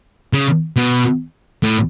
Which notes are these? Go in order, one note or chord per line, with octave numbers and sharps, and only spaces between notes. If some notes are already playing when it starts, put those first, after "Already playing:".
C#3
B2
A2